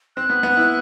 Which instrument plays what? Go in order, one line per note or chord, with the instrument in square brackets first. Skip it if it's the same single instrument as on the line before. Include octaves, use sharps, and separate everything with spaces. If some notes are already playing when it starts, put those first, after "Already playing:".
[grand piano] C4 [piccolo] F#6
[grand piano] B3
B3
E4